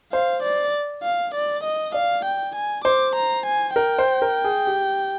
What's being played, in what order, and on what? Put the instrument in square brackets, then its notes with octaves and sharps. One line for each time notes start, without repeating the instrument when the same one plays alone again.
[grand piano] C5 [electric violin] F5
[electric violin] D5
F5
D5
D#5
[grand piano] D5 [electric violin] F5
[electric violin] G5
G#5
[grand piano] C5 [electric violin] D6
[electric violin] A#5
G#5
[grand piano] A#4 [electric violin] G5
[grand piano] C5
A#4
G#4
G4